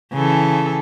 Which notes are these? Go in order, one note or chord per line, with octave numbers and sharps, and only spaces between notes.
C#3 E3 A4